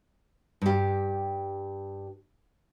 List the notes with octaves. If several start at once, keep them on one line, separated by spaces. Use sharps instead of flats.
G2 G4